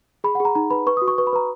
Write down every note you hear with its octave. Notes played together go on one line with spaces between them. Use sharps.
G#4 B5
G#4 F#5
A#5
D#4 A#5
B4 B5
B4 C#6
F#4 D#6
C#6
B4 C#6
B5
B4 A#5